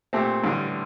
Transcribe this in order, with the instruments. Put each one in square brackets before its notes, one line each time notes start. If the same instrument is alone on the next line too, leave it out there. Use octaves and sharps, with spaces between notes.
[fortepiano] A#2 A3 C4 G4
A1 G2 D3